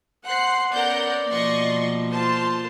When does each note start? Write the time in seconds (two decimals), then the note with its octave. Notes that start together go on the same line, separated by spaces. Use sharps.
0.25 C5 F#5 F#6 C7
0.73 B3 C#4 A#4 D5 F#5 G6
1.31 B2 F3 A#3 D#5 C6 C#6
2.11 F4 C5 A5